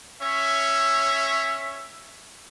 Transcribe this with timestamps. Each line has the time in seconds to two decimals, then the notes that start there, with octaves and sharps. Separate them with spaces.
0.22 C#4 C#5 E5